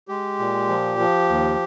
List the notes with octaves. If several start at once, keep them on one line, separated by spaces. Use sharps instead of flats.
G#3 G4
A#2
F3
F3
D#2